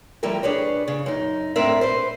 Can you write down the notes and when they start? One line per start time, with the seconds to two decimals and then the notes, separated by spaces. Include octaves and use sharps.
0.23 D2 F3 G3 E4 G4 A#4
0.43 D4 G#4 B4 C#5
0.88 C#3
1.06 F#2 D#4
1.56 A2 C4 D4 A#4 E5
1.81 B4 C5